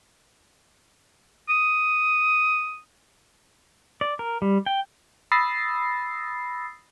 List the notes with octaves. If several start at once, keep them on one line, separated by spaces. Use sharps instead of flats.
D#6
D5
A#4
G3
G5
B5 D#6 E6 A6 A#6 C7